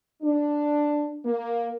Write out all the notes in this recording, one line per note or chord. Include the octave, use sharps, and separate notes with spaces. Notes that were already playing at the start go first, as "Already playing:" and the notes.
D4
A#3